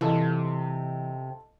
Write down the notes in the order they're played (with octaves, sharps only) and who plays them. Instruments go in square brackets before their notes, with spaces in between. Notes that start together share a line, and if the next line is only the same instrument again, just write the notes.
[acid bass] C3 [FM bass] E3 [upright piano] F4 A4 D#5